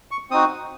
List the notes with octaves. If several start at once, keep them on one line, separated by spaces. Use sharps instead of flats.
C#6
C4 D#4 F#4 D#6